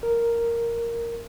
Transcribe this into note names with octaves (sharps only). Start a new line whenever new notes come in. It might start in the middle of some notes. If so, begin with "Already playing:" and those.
A#4